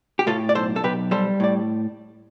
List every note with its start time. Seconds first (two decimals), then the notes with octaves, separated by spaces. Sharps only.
0.19 G4
0.27 A2 F4 A4
0.49 D5
0.55 B1 A4 C5
0.76 A4
0.84 B1 G4 B4
1.11 G3 A4 C5
1.40 A2 D5